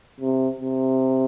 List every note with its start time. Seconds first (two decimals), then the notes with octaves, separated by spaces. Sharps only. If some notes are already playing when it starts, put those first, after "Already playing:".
0.21 C3
0.61 C3